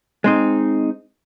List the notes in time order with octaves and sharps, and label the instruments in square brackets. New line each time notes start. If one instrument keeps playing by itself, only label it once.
[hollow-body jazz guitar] G#3 C4 D#4